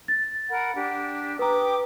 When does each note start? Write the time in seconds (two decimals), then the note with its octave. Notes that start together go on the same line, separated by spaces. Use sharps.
0.08 A6
0.49 A#4 F#5 B5
0.75 D4 G4
1.39 G4 B4 A#5 D6 D#6